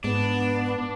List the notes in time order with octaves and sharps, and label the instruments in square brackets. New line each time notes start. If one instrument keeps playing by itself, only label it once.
[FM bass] G#2 [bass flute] B3 [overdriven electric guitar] D4